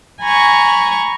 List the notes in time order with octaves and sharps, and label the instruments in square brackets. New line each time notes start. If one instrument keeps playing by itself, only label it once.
[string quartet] G#5 A#5 B5 C#6